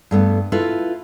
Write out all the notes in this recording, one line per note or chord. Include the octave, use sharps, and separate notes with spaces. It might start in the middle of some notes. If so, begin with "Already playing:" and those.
G2 A3 B3
E4 F4 A4 B4